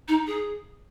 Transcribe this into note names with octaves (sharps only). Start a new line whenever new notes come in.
D#4
G#4